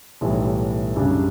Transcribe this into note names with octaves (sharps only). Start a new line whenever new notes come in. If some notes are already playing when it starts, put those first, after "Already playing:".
B1 A2 E3 G3
F#2 C#3 G3 D4 G4